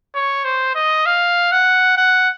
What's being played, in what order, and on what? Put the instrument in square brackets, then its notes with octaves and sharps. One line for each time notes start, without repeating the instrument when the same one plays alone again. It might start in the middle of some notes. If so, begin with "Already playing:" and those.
[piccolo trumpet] C#5
C5
D#5
F5
F#5
F#5